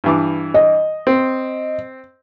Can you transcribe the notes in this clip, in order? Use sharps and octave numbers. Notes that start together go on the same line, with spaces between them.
G2 E3 D6
D#5
C4